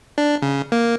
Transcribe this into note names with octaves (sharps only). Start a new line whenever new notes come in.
D4
C#3
A#3